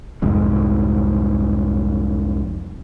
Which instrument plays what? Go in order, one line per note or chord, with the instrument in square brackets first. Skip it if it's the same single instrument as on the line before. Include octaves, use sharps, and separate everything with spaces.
[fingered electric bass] C2 F2 G#2